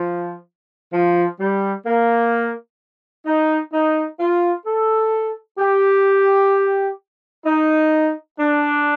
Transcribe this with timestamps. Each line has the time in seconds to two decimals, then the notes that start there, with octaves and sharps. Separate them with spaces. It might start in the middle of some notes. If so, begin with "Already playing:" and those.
Already playing: F3
0.93 F3
1.40 G3
1.86 A#3
3.26 D#4
3.72 D#4
4.19 F4
4.65 A4
5.59 G4
7.45 D#4
8.39 D4